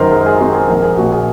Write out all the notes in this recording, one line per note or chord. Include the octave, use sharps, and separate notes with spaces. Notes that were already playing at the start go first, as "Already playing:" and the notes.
Already playing: F#2 D#3 A#4 C5
G#3 A#4
G#4
C4 F#4
G#4
A#1 A#4
G#4
A#2 F#4
G#4